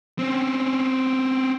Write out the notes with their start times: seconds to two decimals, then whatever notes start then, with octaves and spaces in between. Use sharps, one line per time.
0.19 C4 C#4